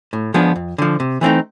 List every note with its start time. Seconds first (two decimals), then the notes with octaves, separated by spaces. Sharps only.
0.13 A2
0.34 F3 G#3 B3 D4
0.56 F2
0.78 D3 F3
1.00 C3
1.21 E3 A3 C4 D#4